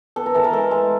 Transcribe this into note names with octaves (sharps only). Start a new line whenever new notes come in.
B3 A4
A#4
E3 A4
A#4
G#3 A4
G#3